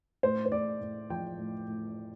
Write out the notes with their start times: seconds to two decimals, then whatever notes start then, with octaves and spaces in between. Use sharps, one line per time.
0.23 A2 C5
0.46 C5
0.52 A2 D5
0.81 A2
1.10 F3 G5
1.38 A2
1.67 A2